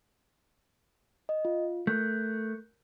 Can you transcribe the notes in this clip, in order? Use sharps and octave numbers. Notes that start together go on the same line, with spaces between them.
D#5
F4
A3 A#4 F#6 G6